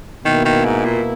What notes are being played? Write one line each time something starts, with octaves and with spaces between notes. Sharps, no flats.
B2 D#3 A#3 E4
D#3
G#2
A#2